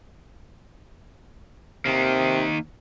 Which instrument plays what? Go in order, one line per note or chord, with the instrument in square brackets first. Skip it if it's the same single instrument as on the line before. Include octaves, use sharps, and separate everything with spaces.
[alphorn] C3 [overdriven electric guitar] D#3 A#3